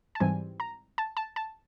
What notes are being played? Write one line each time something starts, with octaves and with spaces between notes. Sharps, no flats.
A5
G#2 E3 G3 C4 G#5
A#5
A5
A5
A5